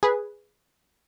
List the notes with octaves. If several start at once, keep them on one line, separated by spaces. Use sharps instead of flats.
G#4 B4